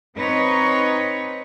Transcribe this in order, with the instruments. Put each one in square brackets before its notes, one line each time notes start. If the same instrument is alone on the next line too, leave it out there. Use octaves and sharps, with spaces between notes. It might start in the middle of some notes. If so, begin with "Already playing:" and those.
[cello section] C4 D#4 B4 C#5